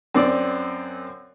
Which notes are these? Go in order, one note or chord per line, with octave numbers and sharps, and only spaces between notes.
F#2 C4 D5